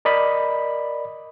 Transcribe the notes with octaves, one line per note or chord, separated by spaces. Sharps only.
A#4 D5 D#5 B5